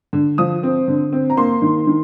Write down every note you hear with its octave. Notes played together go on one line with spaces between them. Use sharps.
D3
F3 D#6
C4
D3
C4
A#5
A#3 C6
D#3
D#3